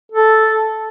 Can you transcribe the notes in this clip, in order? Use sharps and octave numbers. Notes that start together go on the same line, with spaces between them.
A4